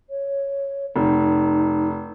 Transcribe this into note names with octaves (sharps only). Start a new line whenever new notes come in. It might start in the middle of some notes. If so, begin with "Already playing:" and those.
C#5
F1 D#4